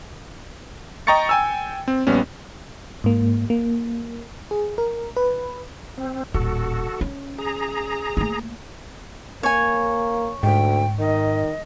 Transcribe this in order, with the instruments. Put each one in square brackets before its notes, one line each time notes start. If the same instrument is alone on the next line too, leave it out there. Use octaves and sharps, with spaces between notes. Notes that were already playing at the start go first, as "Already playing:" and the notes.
[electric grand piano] D#5 G5 A#5 C#6 A6 C#7
G5 G#5 E6
C4
A#1 G3 B3 C#4
[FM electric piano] G#2 A#3
A#3
G#4
A#4
B4
[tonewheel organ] C4
[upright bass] D#1 A1 [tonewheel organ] F#4 A4
[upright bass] C#4
[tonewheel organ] G#4 A#5
[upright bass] A3 A#3
[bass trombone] A#3 [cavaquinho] C#5 G#5
[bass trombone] D2 [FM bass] G#2 [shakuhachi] G5
[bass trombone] D#3 [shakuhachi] D#5